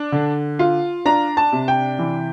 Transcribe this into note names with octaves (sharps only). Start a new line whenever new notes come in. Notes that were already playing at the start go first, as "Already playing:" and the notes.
Already playing: D4
D3
F4
D4 A#5
A5
C3
G5
E3